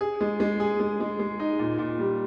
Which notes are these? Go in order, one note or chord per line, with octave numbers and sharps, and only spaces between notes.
G#4
G#3
G#3
G#4
G#3
G#3
G#3
D#4
A#2
A#2
G3